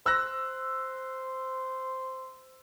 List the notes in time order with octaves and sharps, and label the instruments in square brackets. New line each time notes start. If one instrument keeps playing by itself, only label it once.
[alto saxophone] C5 [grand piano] E6 F#6 A#6